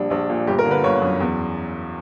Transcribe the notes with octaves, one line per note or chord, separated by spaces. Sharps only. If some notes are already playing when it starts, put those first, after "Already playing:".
Already playing: A#1 G3 D4
A#1 D4
A#2
G1 G4
A#4
D3
B4
G1 C#5
F#2
E2